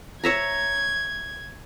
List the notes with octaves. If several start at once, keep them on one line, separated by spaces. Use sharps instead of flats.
C#5 E5 A#5 G#6